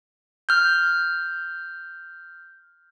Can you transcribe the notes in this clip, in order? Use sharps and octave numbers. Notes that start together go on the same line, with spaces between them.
F6 G6